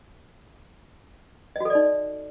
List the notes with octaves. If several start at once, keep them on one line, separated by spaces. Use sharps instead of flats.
D#4 F#4 A4 D5 D#5